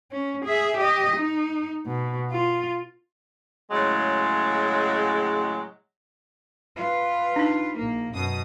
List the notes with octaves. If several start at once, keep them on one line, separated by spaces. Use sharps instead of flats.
C#4
G#4 E5
G4 D#5
D#4
B2
F4
A2 C#3 F#3 G#3
F4 B4
D4 D#4
A#1 A#3
F#2 B2 D#6